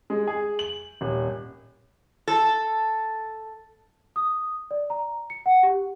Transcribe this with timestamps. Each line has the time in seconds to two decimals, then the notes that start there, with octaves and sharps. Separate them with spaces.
0.10 G#3
0.27 G#4
0.59 F#7
1.01 D#1
2.27 A4
4.16 D#6
4.71 D5
4.90 A#5
5.30 C#7
5.46 F#5
5.63 G4